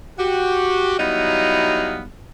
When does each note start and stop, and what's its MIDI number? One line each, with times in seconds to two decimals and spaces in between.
0.18 0.98 66
0.18 0.98 67
0.99 2.05 54
0.99 2.05 55
0.99 2.05 59
0.99 2.05 63
0.99 2.05 64
0.99 2.05 77